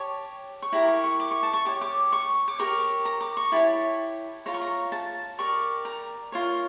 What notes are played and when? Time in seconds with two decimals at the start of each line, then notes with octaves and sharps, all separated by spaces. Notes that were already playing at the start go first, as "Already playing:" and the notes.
Already playing: G4 C#5 A5
0.62 C#6
0.72 E4 G4 A#4 A#5
0.88 C#6
1.04 C#6
1.20 D6
1.31 C#6
1.43 A5
1.54 C#6
1.65 G4 C#5 D6
1.81 D6
2.12 C#6
2.48 D6
2.59 G4 A#4 C#5 C#6
3.05 A#5
3.21 D6
3.37 C#6
3.52 E4 G4 C#5 A5
4.46 F4 C#5 A#5
4.54 C#6
4.62 A#5
4.92 A5
5.38 G4 A#4 D5 C#6
5.85 A#5
6.32 F4 A#4 C#5